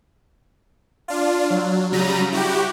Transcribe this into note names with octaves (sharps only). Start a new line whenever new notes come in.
D4 F4
F#3
C#3 F#3 G3 A#5 B5 D#7
E4 F#4 G4